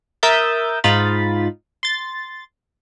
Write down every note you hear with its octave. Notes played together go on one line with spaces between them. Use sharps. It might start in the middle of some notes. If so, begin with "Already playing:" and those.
A#4 E5 D#6 E6 G6 A6
G#2 D#4 F4 B5 A6
C6 A6